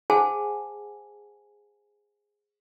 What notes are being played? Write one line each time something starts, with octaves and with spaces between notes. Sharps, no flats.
G#4 C5 F#5 G#5 A5